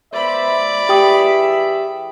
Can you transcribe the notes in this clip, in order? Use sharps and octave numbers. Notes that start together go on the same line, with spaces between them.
B3 C5 D5 E5 B5
E3 G4 G#4 E5 G5 D#6